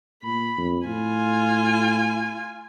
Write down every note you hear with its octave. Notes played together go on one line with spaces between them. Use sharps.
A#2 B5
F2
A2 F4 G#5